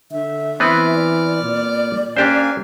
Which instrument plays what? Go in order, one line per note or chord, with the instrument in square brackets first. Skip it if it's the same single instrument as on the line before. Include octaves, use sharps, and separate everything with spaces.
[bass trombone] D3 [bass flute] E5
[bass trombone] E3 [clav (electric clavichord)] B3 C4 B4 [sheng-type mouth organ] D6 F6
[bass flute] D5
[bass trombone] A#2
[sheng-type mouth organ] A#3 F5 G#5 [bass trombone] C#4 [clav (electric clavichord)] D4 G4 C5